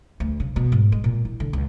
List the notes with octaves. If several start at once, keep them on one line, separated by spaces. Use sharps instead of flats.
D2
C#3
B2
G#2
G#3
A#2
E4
D3
C#2